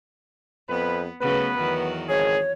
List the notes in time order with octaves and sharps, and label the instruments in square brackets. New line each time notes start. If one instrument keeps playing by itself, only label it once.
[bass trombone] F2 [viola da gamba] B3 [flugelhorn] B4
[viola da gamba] C#3 F#3 A3 [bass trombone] B3 [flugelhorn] B4
[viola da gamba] E2 D#3 F#3
[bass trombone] G#1 [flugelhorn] G#4 [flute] C#5